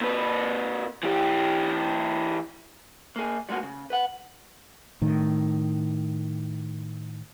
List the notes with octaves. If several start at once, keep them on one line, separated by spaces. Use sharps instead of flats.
A#2 B4
E3 G4
A#3 G#4
G3 G#3 A#3 B3 F#4
C#3
B4 F#5
A2 D#3